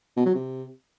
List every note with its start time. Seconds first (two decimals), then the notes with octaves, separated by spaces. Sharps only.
0.17 B2
0.26 F#3
0.35 C3